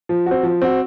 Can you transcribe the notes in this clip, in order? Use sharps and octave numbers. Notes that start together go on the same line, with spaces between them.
F3
C4 F#4
F3
C4 F#4